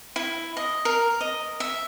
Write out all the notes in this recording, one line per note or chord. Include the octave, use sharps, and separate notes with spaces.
E4
D#5
A#4
D#5
E5